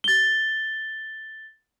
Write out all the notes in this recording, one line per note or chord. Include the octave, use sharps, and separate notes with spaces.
A6 G7